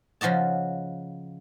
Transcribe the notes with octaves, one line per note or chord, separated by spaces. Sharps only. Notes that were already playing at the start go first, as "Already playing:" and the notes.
C#3 F3 F#4 D#5 A5